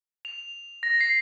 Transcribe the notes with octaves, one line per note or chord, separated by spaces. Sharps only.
F7
A#6
C7